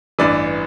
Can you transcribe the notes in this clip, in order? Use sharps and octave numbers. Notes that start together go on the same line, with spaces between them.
A1 G2 E3 D5